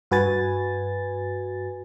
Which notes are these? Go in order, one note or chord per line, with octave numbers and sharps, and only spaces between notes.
G2 F#4 B4 G#5 A6